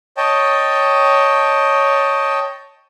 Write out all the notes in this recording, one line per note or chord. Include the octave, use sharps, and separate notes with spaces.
C#5 D#5 G5 A5